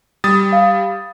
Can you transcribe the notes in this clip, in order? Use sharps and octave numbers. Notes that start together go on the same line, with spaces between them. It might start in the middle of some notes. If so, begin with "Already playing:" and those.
G3 D#6 A6
F5